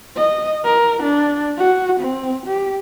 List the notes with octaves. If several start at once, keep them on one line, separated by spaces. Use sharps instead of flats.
D#5
A#4
D4
F#4
C4
G4